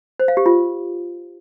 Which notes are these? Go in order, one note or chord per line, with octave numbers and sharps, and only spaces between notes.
C5
F5
G4
F4